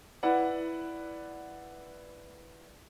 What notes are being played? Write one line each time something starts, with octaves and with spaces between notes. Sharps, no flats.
E4 B4 D5 F#5